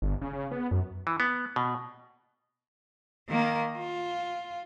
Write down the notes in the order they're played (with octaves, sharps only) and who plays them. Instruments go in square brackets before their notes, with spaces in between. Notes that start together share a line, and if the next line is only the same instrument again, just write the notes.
[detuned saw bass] G1
C#3
C#3
B3
F#2
[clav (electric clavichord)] E3
B3
B2
[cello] D#3 A#3
F4